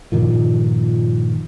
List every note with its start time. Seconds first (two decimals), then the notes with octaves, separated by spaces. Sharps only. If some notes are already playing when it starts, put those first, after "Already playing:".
0.12 G2 A#2 D#3 F3